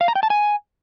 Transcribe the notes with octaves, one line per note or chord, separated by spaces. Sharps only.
F5
A#5
G5
A5
G#5